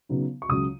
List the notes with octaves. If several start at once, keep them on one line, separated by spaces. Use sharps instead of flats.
C#3 F#3 B3 D#4
C#6
C#2 C#3 F#3 C#4 D#6